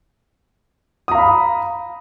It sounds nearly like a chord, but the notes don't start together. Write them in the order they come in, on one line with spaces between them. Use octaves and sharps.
D#6 A#5 F5 B5